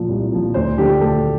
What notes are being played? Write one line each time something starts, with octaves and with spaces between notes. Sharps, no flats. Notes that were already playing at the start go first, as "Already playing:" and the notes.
Already playing: A#2 F3
C2
A#2 F3
D2 C5
D3 F3 G4
D2 A4